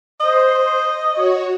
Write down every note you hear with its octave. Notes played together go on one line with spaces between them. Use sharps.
C5 D#5
F#4 C#5